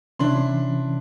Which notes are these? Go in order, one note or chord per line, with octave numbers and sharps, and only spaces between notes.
C3 E3 C#4 D4 E4 C6